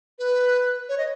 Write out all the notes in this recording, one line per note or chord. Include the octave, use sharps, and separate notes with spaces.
B4
C#5
D#5